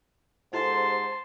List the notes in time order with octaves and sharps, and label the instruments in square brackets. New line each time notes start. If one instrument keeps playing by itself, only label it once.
[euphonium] G#2 [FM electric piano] F4 G4 A4 [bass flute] C5 [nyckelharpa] A5 C6